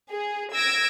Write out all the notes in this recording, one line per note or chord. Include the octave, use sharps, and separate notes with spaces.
G#4
E6 G#6 A#6 D7